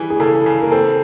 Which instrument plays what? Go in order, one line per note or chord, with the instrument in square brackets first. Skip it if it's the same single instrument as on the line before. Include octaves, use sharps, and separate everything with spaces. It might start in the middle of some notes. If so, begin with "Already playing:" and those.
Already playing: [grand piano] E3 G3 [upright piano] G#4
[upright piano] G#4
[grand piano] C#3 [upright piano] A4
[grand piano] C#3
[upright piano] A#4
[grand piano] C4 [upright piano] A4